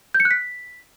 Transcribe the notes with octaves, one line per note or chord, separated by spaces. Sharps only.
G6
C#7
F#6
B6